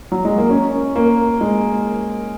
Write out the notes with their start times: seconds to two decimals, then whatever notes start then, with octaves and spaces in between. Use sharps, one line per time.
0.12 F#3
0.25 G#3
0.38 A#3
0.50 C#4
0.96 A#3
1.41 G#3